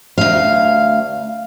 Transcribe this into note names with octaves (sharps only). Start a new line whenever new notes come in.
D2 F5